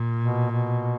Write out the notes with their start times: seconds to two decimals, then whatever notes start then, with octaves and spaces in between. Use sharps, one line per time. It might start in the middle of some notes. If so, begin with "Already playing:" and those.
Already playing: A#2
0.20 B2
0.51 B2